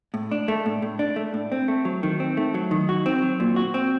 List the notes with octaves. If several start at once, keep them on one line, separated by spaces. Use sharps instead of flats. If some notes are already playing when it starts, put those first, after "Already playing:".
A2
D4
A3
A2
A2
D4
A3
A2
C4
A3
F#3
D#3
C4
A3
F#3
D#3
F#4
C4
F#3
A#2
F#4
C4